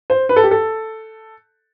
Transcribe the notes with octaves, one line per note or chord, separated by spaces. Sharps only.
C5
B4
A4
G4
A4